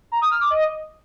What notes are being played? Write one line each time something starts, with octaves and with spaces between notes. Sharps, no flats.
A#5
D#6
F6
D6
D#5